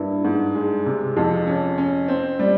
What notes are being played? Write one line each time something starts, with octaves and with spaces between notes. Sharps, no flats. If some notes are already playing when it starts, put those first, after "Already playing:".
Already playing: G2 A#3 E4
G#2
G#3
C3
F2
C#4
C#4
C4
G3